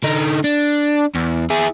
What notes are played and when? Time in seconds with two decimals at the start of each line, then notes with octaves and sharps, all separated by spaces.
0.04 D3 D#4
0.44 D4
1.15 E2
1.50 E4 G#4